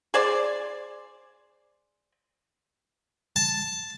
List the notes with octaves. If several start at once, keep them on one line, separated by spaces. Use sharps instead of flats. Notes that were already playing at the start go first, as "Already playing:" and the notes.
G#4 C5 D5
A5